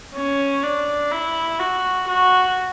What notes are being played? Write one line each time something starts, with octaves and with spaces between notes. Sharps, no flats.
C#4
D4
E4
F#4
F#4